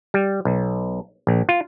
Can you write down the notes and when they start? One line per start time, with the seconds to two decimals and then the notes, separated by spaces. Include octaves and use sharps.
0.14 G3
0.45 B1
1.27 A#1
1.49 F4